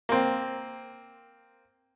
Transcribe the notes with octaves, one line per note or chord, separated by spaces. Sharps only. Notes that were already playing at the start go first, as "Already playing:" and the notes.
A#3 C4